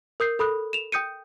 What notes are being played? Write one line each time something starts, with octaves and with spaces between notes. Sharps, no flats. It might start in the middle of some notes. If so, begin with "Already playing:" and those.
A#4 D#6 G6 C7
A4 B5 D#6 F#6
E7 F7
G5 D#6 G6 C#7 D#7